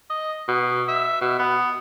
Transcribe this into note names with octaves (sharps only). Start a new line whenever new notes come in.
D#5
B2
E5
B2
B3